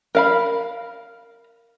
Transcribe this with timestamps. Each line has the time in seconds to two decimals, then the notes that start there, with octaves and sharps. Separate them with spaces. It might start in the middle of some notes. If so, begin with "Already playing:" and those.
0.15 A#4 F5 B5